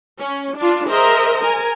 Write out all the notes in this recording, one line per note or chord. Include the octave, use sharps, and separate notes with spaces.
C#4
D4 F4
G#4 A#4 C5 D#5 E5
A#4 G#5